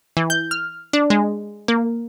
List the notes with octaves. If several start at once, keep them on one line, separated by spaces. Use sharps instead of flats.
E3
G6
F6
D4
G#3
A#3